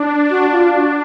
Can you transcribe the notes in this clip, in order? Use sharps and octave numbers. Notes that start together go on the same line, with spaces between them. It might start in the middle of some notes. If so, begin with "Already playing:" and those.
Already playing: D4
F#4
F4
F#4